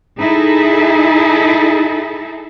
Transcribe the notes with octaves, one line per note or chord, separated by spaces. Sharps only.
D#4 E4 G#4 A4